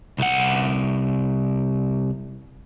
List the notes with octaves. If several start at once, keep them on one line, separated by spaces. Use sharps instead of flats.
C2 F#5